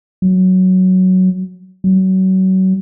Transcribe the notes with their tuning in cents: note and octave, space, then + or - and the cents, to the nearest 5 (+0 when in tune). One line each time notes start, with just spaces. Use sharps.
F#3 +5
F#3 +30